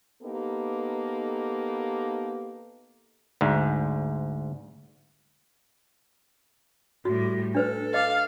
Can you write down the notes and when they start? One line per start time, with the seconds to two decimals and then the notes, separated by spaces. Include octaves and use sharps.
0.22 A#3 B3 D#4 G4 A4
3.41 D2 G#2
7.05 A2 G3 F#4
7.55 D4 A4 B4 C5
7.94 D#5 F5 D6